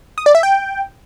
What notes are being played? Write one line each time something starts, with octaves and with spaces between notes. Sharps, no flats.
D#6
D5
E5
G5